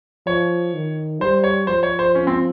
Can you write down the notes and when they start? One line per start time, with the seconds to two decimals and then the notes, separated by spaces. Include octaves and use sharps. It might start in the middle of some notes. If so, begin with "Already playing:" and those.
0.26 F3 C#5
0.74 D#3
1.21 G3 C5
1.44 C#5
1.67 F3 C5
1.83 C#5
1.99 C5
2.15 C#4
2.27 C4